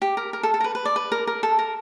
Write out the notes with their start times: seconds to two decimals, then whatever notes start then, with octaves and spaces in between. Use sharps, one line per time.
0.02 G4
0.17 A#4
0.33 A#4
0.43 A4
0.54 A4
0.61 A#4
0.64 B4
0.75 B4
0.85 D5
0.96 B4
1.12 A#4
1.27 A#4
1.43 A4
1.59 A#4